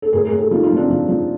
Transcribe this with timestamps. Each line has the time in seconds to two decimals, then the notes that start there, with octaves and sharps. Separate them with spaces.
0.02 A4
0.13 A2 G#4 A#4
0.25 G#4 A#4
0.32 A2
0.38 G4 A4
0.51 F3 D#4 F4
0.64 D#4 F4
0.71 F3
0.76 C4 D4
0.90 F3
1.09 F3